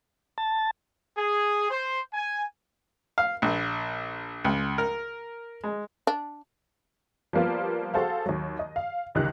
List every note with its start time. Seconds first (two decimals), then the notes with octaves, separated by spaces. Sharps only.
0.38 A5
1.17 G#4
1.70 C5
2.14 G#5
3.18 F5
3.42 A#1
4.44 C#2
4.78 A#4
5.63 G#3
6.07 D4
7.33 F3 G3 A#3 B3 F4
7.94 F#4 G#4 A4 C5 F5
8.26 D#2 F#3
8.59 D#5
8.76 F5
9.15 F#1 C#2 D#3 G4 F#6